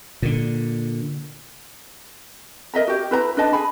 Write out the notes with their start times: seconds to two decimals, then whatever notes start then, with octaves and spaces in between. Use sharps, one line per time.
0.22 A#2 D3
2.74 A#4 D#5 E5 A#5
2.88 F#4 G4
3.11 E4 B4 A#5
3.37 D4 B4 D#5 A5
3.53 G#4 G#5 B5